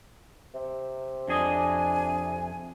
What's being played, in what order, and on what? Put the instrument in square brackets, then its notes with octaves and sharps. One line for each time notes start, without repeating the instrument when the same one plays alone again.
[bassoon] C3
[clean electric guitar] F2 G#4 D#5 [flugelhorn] D4 [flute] G#5